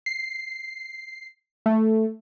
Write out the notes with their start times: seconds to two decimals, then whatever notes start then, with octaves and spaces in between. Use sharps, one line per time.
0.06 C7
1.66 A3